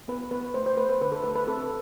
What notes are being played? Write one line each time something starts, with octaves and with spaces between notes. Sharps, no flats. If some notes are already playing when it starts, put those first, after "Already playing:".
B3 B4
B3 B4
A3 C5
C5
A3 B4
B4
D3 B4
A4
A3 B4
B4
C4 A4